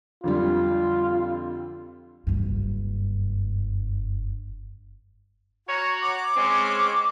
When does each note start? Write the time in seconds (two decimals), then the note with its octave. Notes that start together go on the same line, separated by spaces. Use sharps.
0.24 F2 D3 G3 F4
2.27 F#1 G2
5.68 F#4 C#5 A#5
6.02 D6
6.36 G#3 C4 C#4